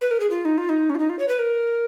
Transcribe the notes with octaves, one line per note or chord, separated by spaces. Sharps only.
B4
A#4
G#4
F4
D#4
F4
D#4
C#4
F4
D#4
F4
C#5
B4
A#4